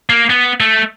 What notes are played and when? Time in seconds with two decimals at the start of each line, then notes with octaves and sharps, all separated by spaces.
0.10 A#3
0.30 B3
0.60 A3